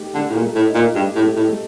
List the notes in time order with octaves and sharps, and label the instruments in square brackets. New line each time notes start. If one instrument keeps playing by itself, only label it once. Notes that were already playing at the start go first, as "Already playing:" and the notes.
Already playing: [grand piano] A3 D#4 G4
[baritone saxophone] D3 [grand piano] A3
[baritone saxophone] A2
A#2
[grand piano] A3
[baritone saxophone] A2
[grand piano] D#4
[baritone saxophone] A#2
[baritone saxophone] G2 [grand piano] G4
[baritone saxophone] A2
[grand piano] A3
[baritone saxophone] A2
[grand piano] A3